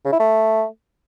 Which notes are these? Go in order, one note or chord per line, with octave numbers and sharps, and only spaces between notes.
C#3
E4
A3